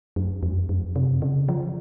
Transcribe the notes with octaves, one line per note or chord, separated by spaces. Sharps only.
F#2
F2
F#2
C3
C#3
F3